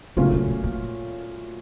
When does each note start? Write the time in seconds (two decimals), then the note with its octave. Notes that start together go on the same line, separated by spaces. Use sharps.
0.17 A#2 C#3 F#3 A3 C#4 F4
0.32 C3
0.48 B2
0.64 A#2